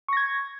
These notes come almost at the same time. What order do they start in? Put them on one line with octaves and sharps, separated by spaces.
C#6 A#6 G#6